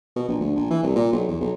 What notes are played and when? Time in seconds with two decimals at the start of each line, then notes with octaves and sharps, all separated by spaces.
0.16 B2
0.28 A#1
0.41 D2
0.56 A#1
0.70 E3
0.83 C2
0.96 A#2
1.13 B1
1.28 E2
1.41 B1